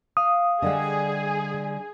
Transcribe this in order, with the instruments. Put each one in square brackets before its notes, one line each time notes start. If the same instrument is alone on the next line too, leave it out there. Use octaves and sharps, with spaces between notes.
[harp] F5 [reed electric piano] D#6
[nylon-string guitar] D3 G3 E5 [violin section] G#4 [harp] D#5 F#5